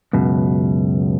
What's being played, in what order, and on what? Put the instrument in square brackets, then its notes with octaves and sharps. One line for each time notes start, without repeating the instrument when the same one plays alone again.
[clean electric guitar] C#2 F#2 B2